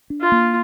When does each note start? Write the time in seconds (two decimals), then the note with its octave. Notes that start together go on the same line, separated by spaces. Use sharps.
0.10 D4
0.21 F4
0.32 A#3